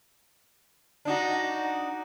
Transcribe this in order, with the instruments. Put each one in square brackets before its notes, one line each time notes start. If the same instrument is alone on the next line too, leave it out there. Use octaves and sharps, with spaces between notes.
[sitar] D4 D#4 F#4